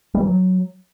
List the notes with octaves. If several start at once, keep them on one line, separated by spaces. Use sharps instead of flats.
G3
E3
F#3